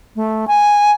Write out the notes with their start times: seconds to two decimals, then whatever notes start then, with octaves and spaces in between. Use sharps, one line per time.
0.16 A3
0.48 G#5